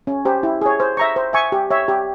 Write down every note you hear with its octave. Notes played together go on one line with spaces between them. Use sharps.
C#4
G4 C5
E4
G#4 C#5
C5
E5 A#5 C#6
C5
E5 G#5 C#6
G4
C#5 E5
G4